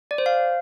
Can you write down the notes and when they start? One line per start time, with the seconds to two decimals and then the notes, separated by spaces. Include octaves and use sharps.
0.11 D5
0.18 C5
0.26 F5